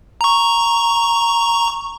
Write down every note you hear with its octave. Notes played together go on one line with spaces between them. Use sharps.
A#5 C#6